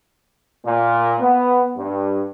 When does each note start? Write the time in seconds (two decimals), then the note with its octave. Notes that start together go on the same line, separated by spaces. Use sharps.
0.65 A#2
1.20 B3
1.77 G2